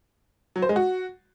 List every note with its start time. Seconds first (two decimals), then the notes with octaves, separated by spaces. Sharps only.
0.56 F#3
0.62 C5
0.69 G#3
0.76 F#4